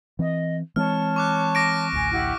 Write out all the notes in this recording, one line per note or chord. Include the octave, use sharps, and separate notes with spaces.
E3 C4 D#5
E3 G#3 C4 C#5 A5 F6
C#6 D6 F#6
D6 A#6 D7
A1 D2 G#5
E4 G4 F#5